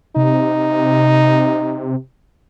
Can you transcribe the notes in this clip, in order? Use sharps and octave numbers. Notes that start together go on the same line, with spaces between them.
C3 D#4